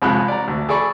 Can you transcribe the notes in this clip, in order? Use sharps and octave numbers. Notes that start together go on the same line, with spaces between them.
C2 F2 G#3 B5 F#6
D5 A#5
D2
G#4 A4 D5 B5 C#6